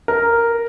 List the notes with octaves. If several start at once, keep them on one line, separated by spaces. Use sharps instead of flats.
A#4